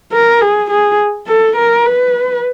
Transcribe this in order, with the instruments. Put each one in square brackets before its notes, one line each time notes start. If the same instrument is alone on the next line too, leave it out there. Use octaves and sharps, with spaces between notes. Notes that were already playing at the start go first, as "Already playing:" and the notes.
[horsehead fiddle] A#4
G#4
G#4
A4
A#4
B4